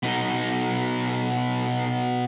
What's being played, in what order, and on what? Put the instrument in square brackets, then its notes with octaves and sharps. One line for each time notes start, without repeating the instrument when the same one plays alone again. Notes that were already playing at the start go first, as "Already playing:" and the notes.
[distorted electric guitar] B2 D#4